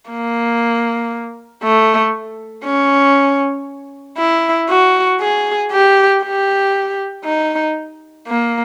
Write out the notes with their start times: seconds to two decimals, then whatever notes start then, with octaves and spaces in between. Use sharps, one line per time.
0.10 A#3
1.63 A3
2.65 C#4
4.18 E4
4.70 F#4
5.20 G#4
5.72 G4
6.23 G4
7.25 D#4
8.27 A#3